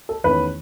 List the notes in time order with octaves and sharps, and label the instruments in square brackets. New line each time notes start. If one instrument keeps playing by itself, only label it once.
[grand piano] A4
E2 D#3 A3 C#4 B4